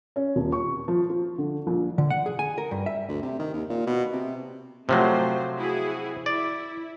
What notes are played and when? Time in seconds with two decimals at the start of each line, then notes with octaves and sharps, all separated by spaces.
0.16 C#4
0.36 D#1
0.52 C#6
0.88 F3
1.10 F4
1.38 D3
1.67 A#1
1.98 D3
2.10 F#5
2.26 G#4
2.39 G#5
2.58 A#4
2.71 G2
2.86 E5
3.08 D2
3.22 C3
3.39 D#3
3.54 D#2
3.70 A#2
3.87 B2
4.12 C3
4.89 C3 F3 F#3 A3 C5
5.57 E4 F#4 G#4
6.26 E4 D5